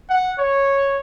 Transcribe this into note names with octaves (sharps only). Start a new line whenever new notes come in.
F#5
C#5